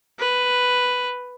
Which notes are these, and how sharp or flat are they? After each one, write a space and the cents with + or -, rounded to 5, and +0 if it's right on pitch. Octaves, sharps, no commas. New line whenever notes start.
B4 +5